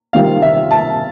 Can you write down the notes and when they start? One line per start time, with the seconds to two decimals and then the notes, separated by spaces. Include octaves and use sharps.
0.13 C3 D#3 G3 C4 F4 F5
0.42 E5
0.71 A5